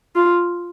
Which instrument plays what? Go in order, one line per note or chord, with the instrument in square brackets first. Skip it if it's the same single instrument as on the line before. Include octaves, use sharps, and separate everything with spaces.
[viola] F4